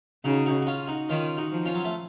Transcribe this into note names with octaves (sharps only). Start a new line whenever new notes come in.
C#3 D#4 F#4
D#4 F#4
F#4
C#4 F4
D#4 F#4
D#3 C#4 F4
D#4 F#4
F3
C#4 F4
F#3
A3